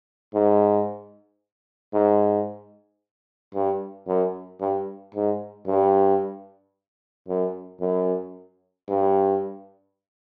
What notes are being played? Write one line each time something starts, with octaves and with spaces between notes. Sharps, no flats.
G#2
G#2
G2
F#2
G2
G#2
G2
F#2
F#2
G2